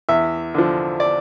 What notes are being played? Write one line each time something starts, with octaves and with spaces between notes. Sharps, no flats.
E2 E5
D3 F3
D5